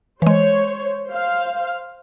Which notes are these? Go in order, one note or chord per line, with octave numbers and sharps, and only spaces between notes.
E3 G#3 C5 C#5
C5 F5